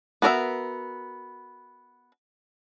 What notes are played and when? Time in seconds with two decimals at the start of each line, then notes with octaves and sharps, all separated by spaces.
0.22 B3 F#4 A#4 C#5 E5